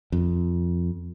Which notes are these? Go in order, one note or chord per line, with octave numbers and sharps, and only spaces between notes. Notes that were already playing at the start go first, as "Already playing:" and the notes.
F2